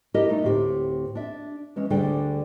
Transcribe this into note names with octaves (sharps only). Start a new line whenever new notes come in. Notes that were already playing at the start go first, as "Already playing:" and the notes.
D4 E4 G4 A#4 D#5
A3 D#4
D2 A2 C4 G4
D4 E5
E3 G#3 C#4
D2 D3 G3 D4 G#4 G5